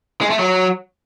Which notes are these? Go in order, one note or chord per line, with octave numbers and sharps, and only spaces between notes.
G#3
A3
F#3